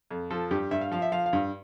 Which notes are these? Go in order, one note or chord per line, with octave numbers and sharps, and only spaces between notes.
F2
F3 A4
G2 G4
G2 E5
F5
F3 F5
E5
F3 F5
F5
G2